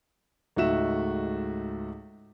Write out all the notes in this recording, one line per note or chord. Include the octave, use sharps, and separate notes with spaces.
C#2 G#2 A3 F#4 E5 E7